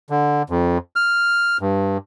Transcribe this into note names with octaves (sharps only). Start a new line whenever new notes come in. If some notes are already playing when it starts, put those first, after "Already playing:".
D3
F2
F6
G2